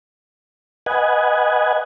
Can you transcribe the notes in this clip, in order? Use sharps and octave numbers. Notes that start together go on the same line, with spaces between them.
B4 D#5 F#5 G#5